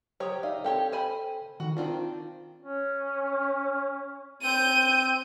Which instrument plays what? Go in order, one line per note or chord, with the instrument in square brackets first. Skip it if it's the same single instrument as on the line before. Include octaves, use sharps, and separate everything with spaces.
[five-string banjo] F#3 G4 C#5 [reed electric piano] C5 D#6
[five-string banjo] D#4 [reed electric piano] D5 E5 F5
[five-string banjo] C4 G4 C#5 [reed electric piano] A4 G5
[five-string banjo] C5 G#5 B5
[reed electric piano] D#3 [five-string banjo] F#4
[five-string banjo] D#3 C4 D4 [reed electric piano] F4
[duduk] C#4
[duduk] C4 [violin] G6 D#7